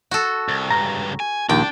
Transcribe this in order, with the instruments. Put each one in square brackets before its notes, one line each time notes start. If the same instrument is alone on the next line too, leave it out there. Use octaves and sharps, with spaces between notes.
[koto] F#4 A4
[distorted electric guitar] C2
[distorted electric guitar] C#2 G2 [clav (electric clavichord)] A#5
[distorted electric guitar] G#5
[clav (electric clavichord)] A#1 D#2 [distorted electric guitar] D4 [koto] G5